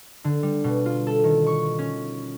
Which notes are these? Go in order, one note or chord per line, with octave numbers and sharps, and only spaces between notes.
D3
G3
B2
F4
A4
D#3
C#6
C#4